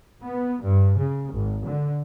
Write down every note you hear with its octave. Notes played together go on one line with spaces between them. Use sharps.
B3
G2
C#3
G#1
D3